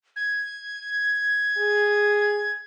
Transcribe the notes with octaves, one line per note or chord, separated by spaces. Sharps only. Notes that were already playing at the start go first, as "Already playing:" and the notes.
G#6
G#4